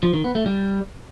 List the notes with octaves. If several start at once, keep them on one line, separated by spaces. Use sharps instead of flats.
F3
D#3
B3
A3
G3